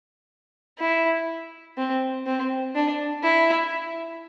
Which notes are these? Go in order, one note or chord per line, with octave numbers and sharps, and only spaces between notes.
E4
C4
C4
D4
E4